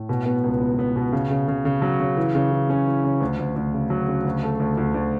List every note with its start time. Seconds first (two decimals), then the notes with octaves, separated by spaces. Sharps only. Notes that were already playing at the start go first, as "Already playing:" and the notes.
Already playing: A2
0.09 B2
0.26 B3
0.44 C#2
0.60 B3
0.79 B3
0.96 B2
1.12 C#3
1.31 C#3
1.48 C#3
1.65 C#3
1.82 F#3
2.00 C#3
2.17 E3
2.35 C#3
2.52 E3
2.70 C#4
2.87 E3
3.04 C#3
3.21 D2
3.39 D2
3.56 D2
3.74 C#3
3.90 F#3
4.08 C#3
4.25 D2
4.43 A3
4.60 D2
4.77 D2
4.94 D2